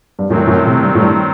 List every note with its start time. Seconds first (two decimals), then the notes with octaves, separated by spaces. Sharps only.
0.19 G2
0.29 F#2 A2 D#3 F#3 C4
0.47 F#2 A2
0.65 A2 C3
0.82 G2
0.95 A2
1.00 G2